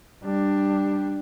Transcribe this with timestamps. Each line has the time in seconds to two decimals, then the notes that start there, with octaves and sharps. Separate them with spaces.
0.24 G3 D4